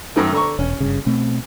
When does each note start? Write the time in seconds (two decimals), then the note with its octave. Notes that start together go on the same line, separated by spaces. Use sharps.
0.16 F#2 D#3 A3
0.32 D3 A#5 C#6
0.59 E1 C#4
0.81 F#1 G2 C#3
1.06 B2 A3 C4